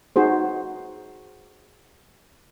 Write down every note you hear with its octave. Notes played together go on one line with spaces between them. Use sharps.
D#4 F#4 G#4 C5